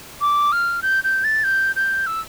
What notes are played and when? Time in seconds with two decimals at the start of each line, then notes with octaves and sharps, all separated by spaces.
0.21 D6
0.52 F6
0.82 G6
1.04 G6
1.24 A6
1.44 G6
1.76 G6
2.07 E6